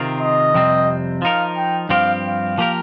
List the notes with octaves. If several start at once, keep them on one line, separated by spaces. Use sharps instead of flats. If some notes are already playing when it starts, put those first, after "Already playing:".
Already playing: C3 D#3 C4 F4 A#4
D#5
F2 C3 G3 C4
F3 D#4 A#4 F5
G5
G2 F3 C4 G4 F5
F5
F3 A#3 G4 A#4